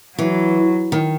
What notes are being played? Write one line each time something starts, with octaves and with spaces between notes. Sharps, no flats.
E3 F#3
D#3